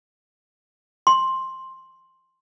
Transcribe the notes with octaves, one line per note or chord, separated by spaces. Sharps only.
C6